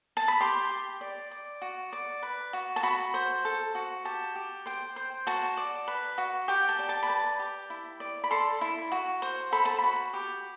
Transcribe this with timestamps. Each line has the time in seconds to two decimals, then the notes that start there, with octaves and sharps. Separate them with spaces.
0.17 A5
0.28 B5
0.40 G4 C6
0.71 G4
1.01 D5
1.31 D5
1.62 F#4
1.93 D5
2.23 B4
2.53 F#4
2.76 A5
2.83 F#4 B5
3.14 C5
3.45 A4
3.75 F#4
4.05 G4 A5
4.36 G4
4.66 C5 G5
4.96 C5
5.27 F#4 A5
5.57 D5
5.88 B4
6.18 F#4
6.48 G4 G5
6.69 A5
6.79 D5
6.89 A5
7.03 B5
7.09 B4 A5
7.39 G4
7.70 E4
8.00 D5
8.24 B5
8.31 A4 C6
8.61 E4
8.92 F#4
9.22 C5
9.52 A4 B5
9.65 A5
9.78 B5
9.83 F#4
10.13 G4